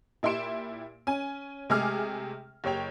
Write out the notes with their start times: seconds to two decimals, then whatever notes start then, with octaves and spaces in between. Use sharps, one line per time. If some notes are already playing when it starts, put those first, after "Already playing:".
0.23 A#2 E4 G4 C6 D7 E7
1.07 C#4 G#5
1.70 C3 G#3 A3 G#4 D6 F6
2.64 F#1 G4 C#5 G5 F7